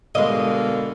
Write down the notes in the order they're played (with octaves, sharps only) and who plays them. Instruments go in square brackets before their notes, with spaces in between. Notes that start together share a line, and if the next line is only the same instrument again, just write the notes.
[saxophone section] B2 D3 A#3 [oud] G#3 D#5